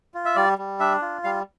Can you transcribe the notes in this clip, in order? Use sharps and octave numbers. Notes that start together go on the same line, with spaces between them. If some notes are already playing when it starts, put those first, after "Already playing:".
F4
E5
G3 D5
G3
D4 E5
F4
G3 F5